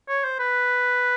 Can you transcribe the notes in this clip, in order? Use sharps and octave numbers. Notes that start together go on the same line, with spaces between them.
C#5
C5
B4